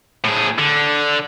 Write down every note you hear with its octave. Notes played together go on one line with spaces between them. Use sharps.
A2 G#4
D3